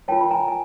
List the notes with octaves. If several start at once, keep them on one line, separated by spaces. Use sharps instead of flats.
F4 A#4 C#5 G5 A5
B5
G#5 A#5
G#5